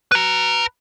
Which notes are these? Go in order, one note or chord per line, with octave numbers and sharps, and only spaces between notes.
B4 A#5